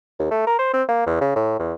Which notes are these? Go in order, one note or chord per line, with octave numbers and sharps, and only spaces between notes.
D#2
A3
A#4
C5
C4
A#3
E2
C#3
A2
E2